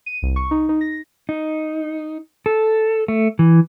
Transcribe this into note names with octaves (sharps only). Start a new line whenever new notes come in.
D#7
C2
C#6
D#4
D#4
A#6
D#4
A4
A3
E3